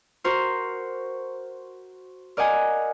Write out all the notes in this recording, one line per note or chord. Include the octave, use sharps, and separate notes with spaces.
F#4 A#4 C5
A#4 D5 D#5 F#5 G#5